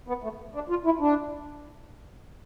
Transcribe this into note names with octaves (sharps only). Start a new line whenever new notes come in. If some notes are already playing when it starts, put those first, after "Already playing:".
B3
A3
D4
F4
E4
D4